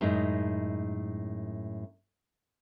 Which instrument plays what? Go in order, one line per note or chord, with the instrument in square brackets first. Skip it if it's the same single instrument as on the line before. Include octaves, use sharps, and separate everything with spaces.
[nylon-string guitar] F#2 A2 G#3 D#4